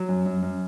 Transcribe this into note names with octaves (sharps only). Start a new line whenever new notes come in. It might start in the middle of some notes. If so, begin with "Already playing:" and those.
Already playing: F#3
F#2
F#2
F#2